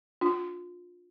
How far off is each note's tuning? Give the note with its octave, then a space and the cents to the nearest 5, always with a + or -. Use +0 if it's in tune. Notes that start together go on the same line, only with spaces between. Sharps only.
D4 +0 F4 +25